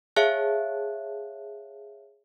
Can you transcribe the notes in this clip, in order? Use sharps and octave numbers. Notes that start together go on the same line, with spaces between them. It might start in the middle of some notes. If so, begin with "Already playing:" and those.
G#4 C#5 E5 F5 A5 F#6